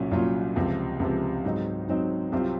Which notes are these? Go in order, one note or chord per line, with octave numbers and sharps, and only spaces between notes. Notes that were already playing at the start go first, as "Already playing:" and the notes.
Already playing: C2 A#2 F#3 C#4 F4
C2 A#2 F#3 C#4 F4
C#2 C3 F3
C#2 C3 F3
G#2 F#3 C4 D#4
G#2 F#3 C4 D#4
C2 C3 F#3 C4 F4